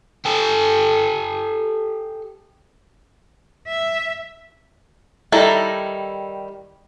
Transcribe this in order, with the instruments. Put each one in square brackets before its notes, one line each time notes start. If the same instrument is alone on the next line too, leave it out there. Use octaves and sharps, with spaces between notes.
[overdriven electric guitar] G4 A4
[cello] E5
[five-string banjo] D#3 G3 E4 A4 A#5